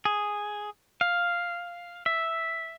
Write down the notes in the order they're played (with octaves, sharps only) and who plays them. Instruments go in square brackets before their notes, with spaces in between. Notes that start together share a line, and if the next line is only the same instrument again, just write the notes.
[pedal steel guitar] G#4
F5
E5